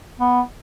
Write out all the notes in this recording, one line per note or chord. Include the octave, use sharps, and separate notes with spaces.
B3